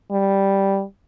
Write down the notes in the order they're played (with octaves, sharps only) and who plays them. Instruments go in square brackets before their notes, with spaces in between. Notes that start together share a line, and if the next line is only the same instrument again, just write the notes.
[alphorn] G3